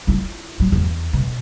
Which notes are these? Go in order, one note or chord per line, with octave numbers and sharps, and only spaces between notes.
E4 F4
F#3
E2
B2